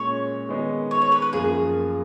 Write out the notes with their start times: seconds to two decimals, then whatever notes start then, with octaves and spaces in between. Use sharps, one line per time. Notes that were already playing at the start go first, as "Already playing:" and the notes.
Already playing: A#2 G#3 C#4 C#5
0.49 D#3 G#3 B3 D#4
0.91 C#5
1.02 C#5
1.12 B4
1.22 B4
1.33 F#2 F3 A#3 G#4